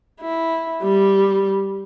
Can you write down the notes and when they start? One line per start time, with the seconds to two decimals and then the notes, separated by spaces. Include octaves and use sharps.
0.21 E4
0.83 G3